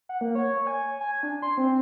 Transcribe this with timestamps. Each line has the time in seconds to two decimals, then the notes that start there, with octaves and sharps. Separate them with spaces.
0.09 F#5
0.21 A#3
0.35 C#5
0.67 G#5
1.01 G#5
1.23 D4
1.42 C6
1.58 C4